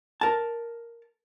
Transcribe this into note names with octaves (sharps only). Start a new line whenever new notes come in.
A#4 A5